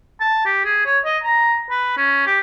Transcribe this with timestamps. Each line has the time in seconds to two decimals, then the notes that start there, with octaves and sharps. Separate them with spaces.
0.20 A5
0.45 G4
0.64 G#4
0.85 C#5
1.05 D#5
1.23 A#5
1.70 B4
1.97 C#4
2.26 G4